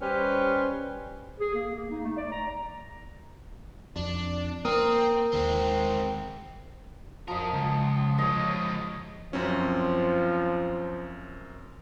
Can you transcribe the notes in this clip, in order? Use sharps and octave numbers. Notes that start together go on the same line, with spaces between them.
G3 C#4 G4 B4 C5
G#4
A#3
A#3
D#4
A3
D5
A#5
F2 D4
A#3 C4 A#4 D#6
D#2 D#3 G#3 C4
F3 C#4 A#4 D#5
C#2
F3 G#3 C#5 D#5
F#2 F3 C4 C#4